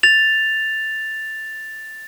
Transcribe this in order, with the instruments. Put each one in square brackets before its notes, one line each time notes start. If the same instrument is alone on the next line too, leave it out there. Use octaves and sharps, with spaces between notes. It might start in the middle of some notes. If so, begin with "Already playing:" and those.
[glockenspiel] A6 F7